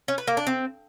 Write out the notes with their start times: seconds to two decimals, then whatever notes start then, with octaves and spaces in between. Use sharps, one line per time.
0.08 C#4
0.18 B4
0.27 A#3
0.37 D4
0.47 C4